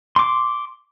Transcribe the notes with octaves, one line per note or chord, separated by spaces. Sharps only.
C6 D6